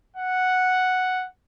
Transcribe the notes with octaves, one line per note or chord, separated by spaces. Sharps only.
F#5